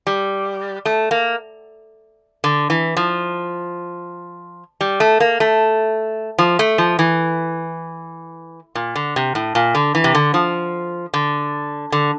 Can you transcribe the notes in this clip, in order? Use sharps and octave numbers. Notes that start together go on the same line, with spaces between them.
G3
A3
A#3
D3
E3
F3
G3
A3
A#3
A3
F3
A3
F3
E3
A#2
D3
C3
A2
A#2
D3
E3
C3
D3
F3
D3
D3